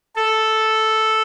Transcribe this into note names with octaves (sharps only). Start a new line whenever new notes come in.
A4